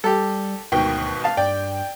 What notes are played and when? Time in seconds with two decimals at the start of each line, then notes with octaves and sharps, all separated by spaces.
0.04 G3 G4 A4
0.72 G#1 D2 B2 D#3 G5
1.24 F5 A5
1.37 G2 D5 G5